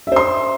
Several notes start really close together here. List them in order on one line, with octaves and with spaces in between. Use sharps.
E5 C5 C6